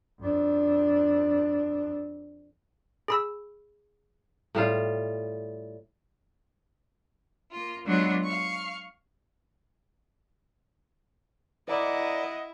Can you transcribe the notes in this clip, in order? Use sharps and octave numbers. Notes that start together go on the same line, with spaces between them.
F2 D4
G#4 B5 E6
A2 G3 F4
A#3 F4
F#3 G#3 B3 D4 F4 F#4
F5 C#6
E4 A#4 D5 D#5 F#5